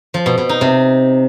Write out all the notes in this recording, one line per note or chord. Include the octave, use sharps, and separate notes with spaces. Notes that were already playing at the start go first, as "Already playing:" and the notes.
F3
B2
B2
D#4
C3